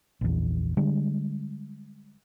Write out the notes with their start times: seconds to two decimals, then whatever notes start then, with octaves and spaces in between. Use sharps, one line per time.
0.21 A#1 E2
0.77 D3 G3 G#3